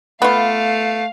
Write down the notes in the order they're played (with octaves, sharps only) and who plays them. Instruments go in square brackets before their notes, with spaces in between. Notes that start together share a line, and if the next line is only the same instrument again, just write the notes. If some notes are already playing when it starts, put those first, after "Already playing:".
[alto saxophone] A3 [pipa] B3 F4 [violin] F5